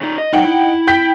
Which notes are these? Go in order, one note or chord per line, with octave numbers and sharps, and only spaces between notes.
C#3 D#4
D#5
F#3 G#3 D#4 F#5 G5
E4
G5 G6 B6